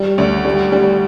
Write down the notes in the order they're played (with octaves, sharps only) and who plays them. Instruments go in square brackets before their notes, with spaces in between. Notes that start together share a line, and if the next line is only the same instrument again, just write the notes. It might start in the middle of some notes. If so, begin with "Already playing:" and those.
Already playing: [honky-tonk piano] G3
D2
G3
G3